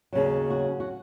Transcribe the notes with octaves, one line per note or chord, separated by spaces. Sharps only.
D#2 C#3 F#3
F#4
F#4